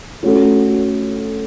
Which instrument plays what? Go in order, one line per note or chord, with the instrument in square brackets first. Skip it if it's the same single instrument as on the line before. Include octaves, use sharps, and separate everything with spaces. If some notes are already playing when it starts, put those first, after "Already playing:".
[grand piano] A3 C#4 F#4 A4